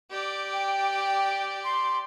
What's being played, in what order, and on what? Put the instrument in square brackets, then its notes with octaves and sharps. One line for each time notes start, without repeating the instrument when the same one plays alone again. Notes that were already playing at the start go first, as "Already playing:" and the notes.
[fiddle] G4 D5
[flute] G5
C6